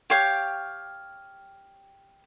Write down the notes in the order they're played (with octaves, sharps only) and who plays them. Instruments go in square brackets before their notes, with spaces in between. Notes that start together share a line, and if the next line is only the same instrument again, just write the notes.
[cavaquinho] G4 C#5 F5 G5